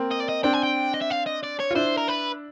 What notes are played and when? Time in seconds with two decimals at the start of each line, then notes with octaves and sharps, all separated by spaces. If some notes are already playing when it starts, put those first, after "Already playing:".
Already playing: A#3 C4
0.11 D#5
0.20 D5
0.29 D#5
0.43 C4 D4 G5
0.53 G#5
0.63 G5
0.94 D#5
1.01 E5
1.10 F5
1.26 D#5
1.43 D5
1.60 C#5
1.71 F4
1.75 D4 E4 C5
1.98 A#4
2.08 B4